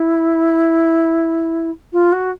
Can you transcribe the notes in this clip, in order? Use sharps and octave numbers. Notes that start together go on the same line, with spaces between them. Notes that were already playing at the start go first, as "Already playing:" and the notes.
Already playing: E4
F4
F#4